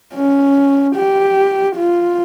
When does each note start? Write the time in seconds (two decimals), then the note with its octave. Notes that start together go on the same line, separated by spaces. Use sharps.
0.14 C#4
0.96 G4
1.76 F4